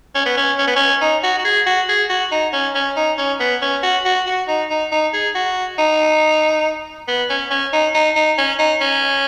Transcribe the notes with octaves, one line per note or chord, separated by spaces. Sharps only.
C#4
B3
C#4
C#4
B3
C#4
D#4
F#4
F#4
G#4
F#4
G#4
F#4
D#4
C#4
C#4
D#4
C#4
B3
C#4
F#4
F#4
F#4
D#4
D#4
D#4
G#4
F#4
D#4
B3
C#4
C#4
D#4
D#4
D#4
C#4
D#4
C#4